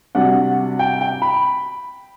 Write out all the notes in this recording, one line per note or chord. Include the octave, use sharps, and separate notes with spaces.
C3 G3 D4 F#4 F#5
G5
G5
B5